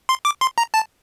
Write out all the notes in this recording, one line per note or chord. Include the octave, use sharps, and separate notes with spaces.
C6
D6
C6
A#5
A5